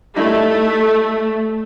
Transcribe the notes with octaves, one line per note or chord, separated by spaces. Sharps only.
G3 A3 D#4 E4